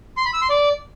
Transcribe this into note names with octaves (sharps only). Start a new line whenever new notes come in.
C6
B5
E6
C6
D5